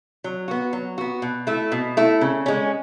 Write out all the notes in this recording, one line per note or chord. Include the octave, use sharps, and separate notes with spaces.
F#3
B3 F#4
F#3
B3 F#4
B2
A3 E4
B2
A3 E4
C#3
G#3 C#4